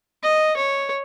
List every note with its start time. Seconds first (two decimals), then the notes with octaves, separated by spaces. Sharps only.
0.23 D#5
0.57 C#5